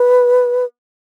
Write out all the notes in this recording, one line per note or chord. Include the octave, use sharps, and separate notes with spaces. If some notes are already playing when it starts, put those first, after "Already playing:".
Already playing: B4